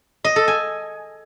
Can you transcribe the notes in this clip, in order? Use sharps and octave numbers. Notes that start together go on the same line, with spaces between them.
D#5
A4
G#5